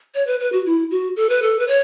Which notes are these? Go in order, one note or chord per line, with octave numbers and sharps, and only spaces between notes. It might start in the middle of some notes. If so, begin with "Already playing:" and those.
C#5
B4
B4
F#4
E4
F#4
A4
B4
A4
B4
C#5